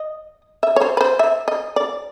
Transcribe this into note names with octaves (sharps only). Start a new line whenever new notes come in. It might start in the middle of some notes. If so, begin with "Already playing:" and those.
Already playing: D#5
E5
C#5
C5
B4
C5
E5
D#5
D5